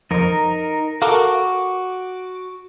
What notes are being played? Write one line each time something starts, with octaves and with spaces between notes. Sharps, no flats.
F2 D#4 A#4
F#4 A4 A#4 F5 D6